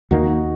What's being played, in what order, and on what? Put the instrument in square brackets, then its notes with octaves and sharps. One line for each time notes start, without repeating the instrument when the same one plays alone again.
[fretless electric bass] D#2 D#3 A#3 [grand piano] D#4 F#4